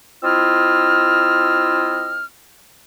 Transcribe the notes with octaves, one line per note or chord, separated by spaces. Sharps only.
C4 E4 F4 D#5 E6 F6